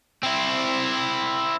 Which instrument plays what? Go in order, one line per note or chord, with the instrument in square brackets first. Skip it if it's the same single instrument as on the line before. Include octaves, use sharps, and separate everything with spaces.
[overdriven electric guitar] C4 E4